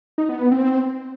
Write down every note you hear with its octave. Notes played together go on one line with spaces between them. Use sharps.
D#4
B3
B3
C4